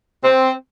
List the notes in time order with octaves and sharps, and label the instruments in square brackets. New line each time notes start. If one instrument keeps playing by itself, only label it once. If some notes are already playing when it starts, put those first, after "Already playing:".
[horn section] C4